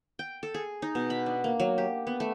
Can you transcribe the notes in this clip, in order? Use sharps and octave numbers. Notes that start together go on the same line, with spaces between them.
G5
A4
G#4
D#4
B2
B5
D4
A#3
F#3
G4
B3
A3